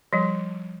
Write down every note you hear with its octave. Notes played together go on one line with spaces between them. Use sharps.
F3 G3